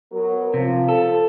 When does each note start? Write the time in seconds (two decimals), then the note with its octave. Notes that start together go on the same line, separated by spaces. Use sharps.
0.12 F#3 B3 A#4
0.54 C3 F3
0.89 A4